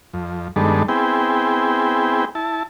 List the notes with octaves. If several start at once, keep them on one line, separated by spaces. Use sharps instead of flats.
F2
G2 D#3 G#3 B3 D4 A4
B3 C4 E4 G#4 G5
E4 A5